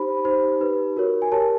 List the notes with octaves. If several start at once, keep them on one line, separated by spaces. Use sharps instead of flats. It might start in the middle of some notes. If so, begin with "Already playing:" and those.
Already playing: D#4 G4 C5 B5
D#4 G4 C5
D#4 G4 B4
F#4 A#4 C#5
G#5
G4 A#4 C#5 A5